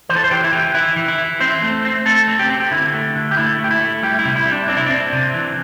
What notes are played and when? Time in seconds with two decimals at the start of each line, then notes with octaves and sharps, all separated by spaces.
0.09 E3 C5
0.16 A4
0.24 C5
0.31 E3 G4
0.44 E4
0.53 E3 G4
0.74 E3 E4
0.96 E3
1.08 E4
1.18 E3
1.40 C4 C5
1.62 A3
1.85 C4
2.06 A3 A4
2.28 C4
2.39 G4
2.50 C4
2.60 G4
2.71 D3 E4
2.93 A3
3.15 D3
3.31 G4
3.37 A3 E4
3.59 A3
3.64 G4
3.71 E4
3.80 A3
4.03 G3 G4
4.19 E4
4.25 C3
4.36 E4
4.46 G3
4.52 D4
4.68 C4 D4
4.77 E4
4.86 C4 D4
5.12 C3
5.34 E3